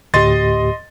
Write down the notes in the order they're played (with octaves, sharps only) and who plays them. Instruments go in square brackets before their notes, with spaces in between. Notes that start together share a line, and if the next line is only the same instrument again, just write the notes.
[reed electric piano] D2 A2 G4 [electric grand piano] D#5 C6 A6